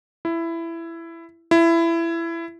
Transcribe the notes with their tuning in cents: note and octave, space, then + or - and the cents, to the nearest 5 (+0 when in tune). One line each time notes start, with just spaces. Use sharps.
E4 +15
E4 +20